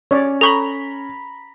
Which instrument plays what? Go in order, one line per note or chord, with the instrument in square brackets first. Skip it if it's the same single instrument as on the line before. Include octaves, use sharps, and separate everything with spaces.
[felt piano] C#4 [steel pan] C#5 D5
[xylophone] A4 C#6 F#7 [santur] A#5 B5